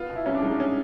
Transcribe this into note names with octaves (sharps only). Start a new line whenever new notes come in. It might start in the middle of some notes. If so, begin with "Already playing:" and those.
Already playing: B3 F4
B2
E4
C2 C#4
D4
G#3 D#4
D4
C#4